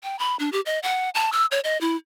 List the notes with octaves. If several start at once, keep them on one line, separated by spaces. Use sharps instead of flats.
G5
B5
D4
G4
D#5
F#5
A5
E6
C#5
D#5
E4